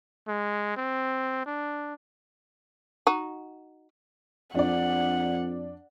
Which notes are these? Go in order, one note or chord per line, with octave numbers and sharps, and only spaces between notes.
G#3
C4
D4
D#4 F#4
F2 D4 D5 F#5